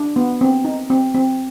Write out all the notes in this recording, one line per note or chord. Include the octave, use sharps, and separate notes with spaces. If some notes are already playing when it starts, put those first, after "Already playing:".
Already playing: D4
B3
C4
D#4
C4
C4